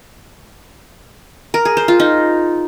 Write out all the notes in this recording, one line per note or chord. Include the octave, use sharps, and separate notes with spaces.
A#4
G#4
C5
F4
D#4